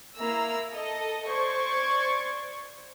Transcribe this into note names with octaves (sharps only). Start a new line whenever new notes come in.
A#3 E4 A#5 E6
A4 D#5
C5 D5 C#6 G#6